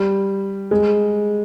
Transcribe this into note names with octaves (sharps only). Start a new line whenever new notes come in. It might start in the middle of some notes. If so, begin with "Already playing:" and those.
Already playing: G3
G#3